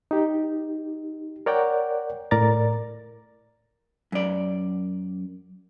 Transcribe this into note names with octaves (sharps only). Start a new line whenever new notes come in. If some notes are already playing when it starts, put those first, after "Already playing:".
D#4 G4
A#4 C#5 D5 F#5 G5
A2 A#4 D5 A#5 A6
F#2 D5